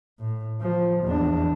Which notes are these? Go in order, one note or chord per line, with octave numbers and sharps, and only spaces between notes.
A2
F3
E2 D4